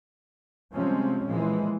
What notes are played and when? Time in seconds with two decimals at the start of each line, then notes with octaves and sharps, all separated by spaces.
0.73 C3 F3 G3 G#3 C4 C#4
1.26 A#2 E3 F3 G#3